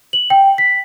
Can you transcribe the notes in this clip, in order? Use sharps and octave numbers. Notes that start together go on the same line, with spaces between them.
F#7
G5
B6